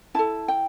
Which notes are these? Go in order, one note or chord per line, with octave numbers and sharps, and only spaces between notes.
E4 A4 A5
G5